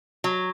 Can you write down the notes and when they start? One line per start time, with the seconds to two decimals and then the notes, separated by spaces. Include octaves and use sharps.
0.24 F#3